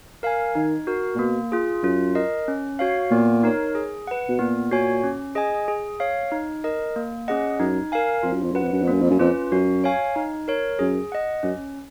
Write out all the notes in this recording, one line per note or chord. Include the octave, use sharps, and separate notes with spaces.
A#4 F5 G#5
D#3 D#4
F#4 A#4
A#2
B2 A#3
F4 G#4
F#2 F4
A#4 D#5
C#4
F#4 C#5 F5
A#2 B3
D#4 A#4 C#5
G#4
B4 F#5
B2
A#2 B3
F#4 C#5 G#5
C#4
G#4 D#5 G#5
G#4
C#5 F5
D#4
A#4 D#5
A#3
C#4 G#4 D#5 F#5
F#2 D#4
A#4 F5 G#5
F2 F4
F#2
F2
F#2 B4 F#5
F2
F#2
F2
F#2 A#3
F2
F#2
F2 C#4 F4 B4
F#2 F#4
C#5 F5 G#5
D#4
A#4 C#5
F#2 G#4
D#5 F#5
F#2 C#4